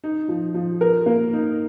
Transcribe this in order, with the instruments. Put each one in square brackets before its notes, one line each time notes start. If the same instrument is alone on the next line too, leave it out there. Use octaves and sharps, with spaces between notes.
[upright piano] D#4
F3
F3
A#4
A#3
D#4